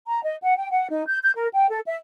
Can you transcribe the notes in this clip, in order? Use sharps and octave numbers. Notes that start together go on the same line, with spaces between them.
A#5
D#5
F#5
G5
F#5
D#4
G6
G6
A#4
G5
A4
E5